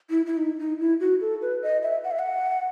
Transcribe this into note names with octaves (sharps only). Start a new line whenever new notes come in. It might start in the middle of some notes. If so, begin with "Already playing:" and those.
E4
E4
D#4
D#4
E4
F#4
A4
B4
D#5
E5
F#5
E5
F#5